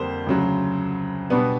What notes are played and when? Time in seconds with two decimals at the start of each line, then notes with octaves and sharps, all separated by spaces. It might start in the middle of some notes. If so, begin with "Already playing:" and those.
Already playing: F2 D3 G3 A#3 C5
0.27 D2 C#3 F#3
1.30 B2 G3 B3 D4 B4